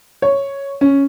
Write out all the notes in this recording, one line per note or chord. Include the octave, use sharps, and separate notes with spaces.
C#5
C#4